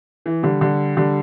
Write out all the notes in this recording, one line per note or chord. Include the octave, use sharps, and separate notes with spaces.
E3
D3 G3
D3 G3
D3 G3